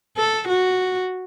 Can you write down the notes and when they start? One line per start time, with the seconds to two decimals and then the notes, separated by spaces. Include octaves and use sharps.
0.17 A4
0.49 F#4